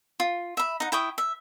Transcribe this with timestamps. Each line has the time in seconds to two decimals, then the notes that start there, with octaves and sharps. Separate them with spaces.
0.20 F4
0.57 E5 B5
0.80 D#4 F#5
0.92 E4 G5 C#6 D#6
1.18 E5